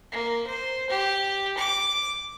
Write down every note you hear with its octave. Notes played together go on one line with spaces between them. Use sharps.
A#3
C5
G4
D6